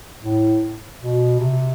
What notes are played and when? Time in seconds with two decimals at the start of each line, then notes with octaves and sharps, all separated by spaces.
0.23 A2
1.00 B2
1.39 C3